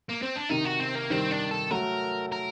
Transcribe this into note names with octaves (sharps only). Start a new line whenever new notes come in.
A#3
C4
D4
C3 D#3 D#4
F#4
C4
A#3
D#3 G3 C4
D4
A4
F#3 A3 A#4
A#4